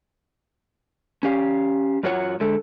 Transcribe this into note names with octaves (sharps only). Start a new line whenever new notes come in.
C#4 G4 F5
F#2 F4 F#4 C#5 F#5
D3 G#3 A4